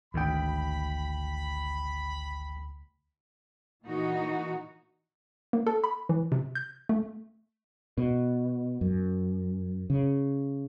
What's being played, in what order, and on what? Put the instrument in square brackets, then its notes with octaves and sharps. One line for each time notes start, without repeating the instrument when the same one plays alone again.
[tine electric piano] G#1 G5 [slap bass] D2 [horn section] B5
[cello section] A#2 E3 D#4 F#4
[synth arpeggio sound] A#3
A4
B5
E3
C3
G6
A3
[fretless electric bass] B2
F#2
C#3